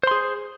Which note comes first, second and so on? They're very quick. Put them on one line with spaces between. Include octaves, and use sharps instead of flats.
C5 C6 G#4